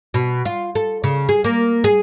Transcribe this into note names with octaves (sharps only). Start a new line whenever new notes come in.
B2
F4
A4
C#3
G#4
A#3
G#4